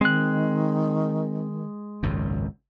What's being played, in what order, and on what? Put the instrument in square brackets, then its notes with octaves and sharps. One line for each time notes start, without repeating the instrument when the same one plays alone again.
[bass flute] D#3 [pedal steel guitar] G#3 F#6 [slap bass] C4
[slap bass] G#1 C#2 F#2